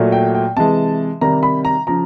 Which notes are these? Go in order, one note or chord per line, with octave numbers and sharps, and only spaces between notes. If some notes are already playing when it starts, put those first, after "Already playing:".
Already playing: A#2 F#3 A3
G5
G5
C3 E3 G#3 A5
C3 D#3 G3 A#5
B5
A#5
C#3 F3 A#5